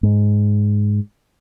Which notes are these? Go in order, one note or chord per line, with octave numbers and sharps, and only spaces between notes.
G#2